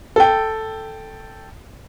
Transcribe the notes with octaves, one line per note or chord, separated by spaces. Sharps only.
A4 G5